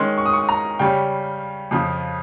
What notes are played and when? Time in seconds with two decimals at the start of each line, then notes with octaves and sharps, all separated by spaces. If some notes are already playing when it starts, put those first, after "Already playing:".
Already playing: D#3 G#3 C#4 C6
0.18 C#6
0.26 D#6
0.33 C#6
0.49 A#5
0.79 C#3 G3 C#4 G5
1.71 F2 C#3 F3